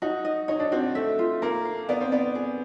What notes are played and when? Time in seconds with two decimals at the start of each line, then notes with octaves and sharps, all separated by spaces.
0.02 D#4 F#4
0.25 D#5
0.48 D#4 C#5
0.59 D4
0.72 C4 F#4
0.95 A3 E5
1.19 F4
1.42 A#3 A#4
1.65 F5
1.89 B3 D5
2.01 C4
2.12 B3 D5
2.35 G#4